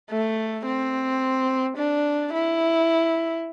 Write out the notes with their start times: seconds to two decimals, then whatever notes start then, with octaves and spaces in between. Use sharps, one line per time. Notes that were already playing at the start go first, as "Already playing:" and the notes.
0.10 A3
0.66 C4
1.77 D4
2.33 E4